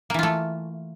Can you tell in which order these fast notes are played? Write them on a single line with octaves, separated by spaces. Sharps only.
A#3 E3 F4 A3